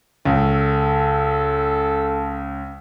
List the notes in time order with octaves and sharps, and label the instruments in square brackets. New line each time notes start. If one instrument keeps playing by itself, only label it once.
[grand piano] C#2 [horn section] A4